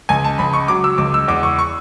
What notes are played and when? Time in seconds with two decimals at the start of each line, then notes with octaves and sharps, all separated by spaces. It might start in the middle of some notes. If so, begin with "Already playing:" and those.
0.09 C#2 G#5
0.24 A5
0.38 C#2 B5
0.53 C#6
0.68 F#3 D6
0.84 E6
0.98 C#2 D6
1.14 E6
1.28 E2 D6
1.43 C#6
1.59 C#6